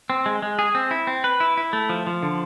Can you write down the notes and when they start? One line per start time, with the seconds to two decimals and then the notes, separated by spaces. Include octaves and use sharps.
0.10 C4
0.26 G#3
0.42 G#3
0.59 G#4
0.75 C4
0.91 E4
1.07 C4
1.24 B4
1.40 E4
1.57 E4
1.73 A3
1.89 F3
2.07 F3
2.23 D3